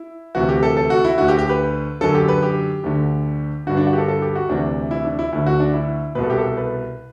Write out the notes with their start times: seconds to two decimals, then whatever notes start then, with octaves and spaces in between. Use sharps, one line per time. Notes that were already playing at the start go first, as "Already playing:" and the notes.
Already playing: E4
0.35 D2 C3 E3 F#4
0.49 G4
0.63 A4
0.77 A4
0.90 F#4
1.04 E4
1.18 D2 D3 F#4
1.28 G4
1.39 G4
1.49 B4
2.01 F#2 D3 A4
2.15 G4
2.28 B4
2.42 G4
2.84 D2 D3
3.67 G2 D3 F#4
3.77 D4
3.87 F#4
3.93 G4
3.98 A4
4.08 A4
4.22 G4
4.35 F#4
4.49 D2 C3 E3 D4
4.91 E4
5.04 D4
5.19 E4
5.33 D2 D3 E4
5.46 F#4
5.60 D4
5.73 E4
6.15 B2 B4
6.18 C2 A4
6.30 G4
6.38 A4
6.57 B4